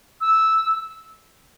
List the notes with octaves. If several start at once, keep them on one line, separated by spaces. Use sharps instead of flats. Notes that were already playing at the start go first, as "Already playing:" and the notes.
E6